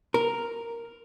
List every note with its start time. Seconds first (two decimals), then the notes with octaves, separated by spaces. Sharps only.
0.14 A#4